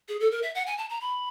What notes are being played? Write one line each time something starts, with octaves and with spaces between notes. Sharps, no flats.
G#4
A4
A#4
E5
F#5
G#5
A5
A#5
B5